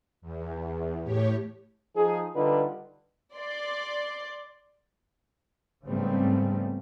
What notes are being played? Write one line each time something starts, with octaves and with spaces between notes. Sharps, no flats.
E2
A2 G4 C#5
F3 D#4 G#4
D3 G3 D#4 F4 B4
D5 C6
G#2 C#3 G3 A3 B3 C4